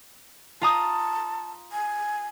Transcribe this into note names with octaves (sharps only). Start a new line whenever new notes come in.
F4 A5 A#5 D#6
G#5